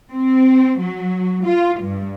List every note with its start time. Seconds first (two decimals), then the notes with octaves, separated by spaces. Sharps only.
0.11 C4
0.80 F#3
1.45 F4
1.81 G2